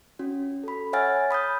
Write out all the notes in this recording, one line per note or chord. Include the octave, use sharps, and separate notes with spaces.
C#4 F#4
A4 B5
C#5 E5 F#5 G#5 F6 A6
B5 D#6 F6 G6